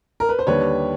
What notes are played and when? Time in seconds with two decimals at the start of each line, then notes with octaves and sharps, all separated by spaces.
0.20 A#4
0.29 B4
0.39 C5
0.47 D#2 D3 G3 B4 C#5